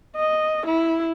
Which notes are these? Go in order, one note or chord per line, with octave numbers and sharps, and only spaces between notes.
D#5
E4